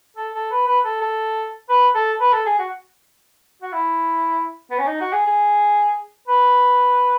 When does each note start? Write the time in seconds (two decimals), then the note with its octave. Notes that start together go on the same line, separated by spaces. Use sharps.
0.17 A4
0.34 A4
0.51 B4
0.67 B4
0.85 A4
1.01 A4
1.69 B4
1.95 A4
2.20 B4
2.33 A4
2.46 G#4
2.59 F#4
3.62 F#4
3.73 E4
4.71 B3
4.79 C#4
4.87 D#4
5.01 F#4
5.12 G#4
5.26 G#4
6.28 B4